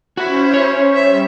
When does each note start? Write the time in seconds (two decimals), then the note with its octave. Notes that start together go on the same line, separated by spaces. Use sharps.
0.17 C#4 E4 F#4 C5
0.54 C#5
0.95 G3 E5